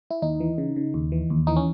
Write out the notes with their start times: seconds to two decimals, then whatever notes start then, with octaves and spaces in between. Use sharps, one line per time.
0.11 E4
0.22 D#2 D#4
0.40 E3
0.58 C#3
0.76 C#3
0.94 D#2
1.12 E3
1.30 D#2
1.47 E3 D#4
1.56 C#4